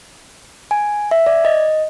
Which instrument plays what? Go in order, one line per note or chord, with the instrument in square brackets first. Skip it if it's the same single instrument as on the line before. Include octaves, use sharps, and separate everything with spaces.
[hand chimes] G#5
E5
D5
D#5